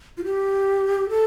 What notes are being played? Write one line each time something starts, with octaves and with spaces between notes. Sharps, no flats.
F4
G4
A4